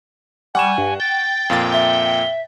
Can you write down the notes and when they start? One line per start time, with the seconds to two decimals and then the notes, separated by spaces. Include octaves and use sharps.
0.55 G3 F#5 G#5 C#6 E7
0.78 G2
1.00 G5 A6
1.50 F2 A#2 F5 A6
1.72 E5 G7